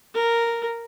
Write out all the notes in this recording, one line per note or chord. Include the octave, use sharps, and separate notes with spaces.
A#4